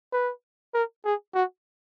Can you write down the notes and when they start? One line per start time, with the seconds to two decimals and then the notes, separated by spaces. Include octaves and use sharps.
0.13 B4
0.74 A#4
1.05 G#4
1.35 F#4